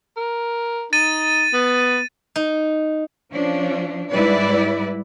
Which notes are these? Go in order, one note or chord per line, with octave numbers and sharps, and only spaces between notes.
A#4
D#4 A6 D#7
B3
D#4
F3 C#4 D4
G#2 G3 E4 B4 D5